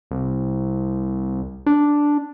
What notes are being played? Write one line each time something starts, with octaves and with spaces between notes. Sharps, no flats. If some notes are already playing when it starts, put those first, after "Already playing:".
C2
D4